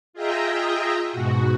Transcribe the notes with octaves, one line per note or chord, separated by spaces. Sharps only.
F4 G#4 D#5 E5 G5 A#5
G#2 B2 F#4